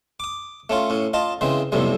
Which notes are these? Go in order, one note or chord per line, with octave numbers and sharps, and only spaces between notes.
D6 D#6
A3 C#4 F4
A2 C#4
F4 D#5 A5
C#3 E3 G#3 C4
B1 F2 A2 C3 G3